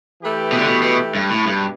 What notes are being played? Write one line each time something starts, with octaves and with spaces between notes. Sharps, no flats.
E3 A3 G4 B4
B2
D3
B2
B2
G2
A2
G2 B2